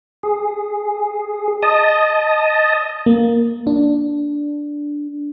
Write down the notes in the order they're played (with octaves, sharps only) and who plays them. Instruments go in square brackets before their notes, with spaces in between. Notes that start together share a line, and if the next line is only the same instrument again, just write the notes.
[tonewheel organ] G#4
D#5 A5 D#6
[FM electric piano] A#3
D4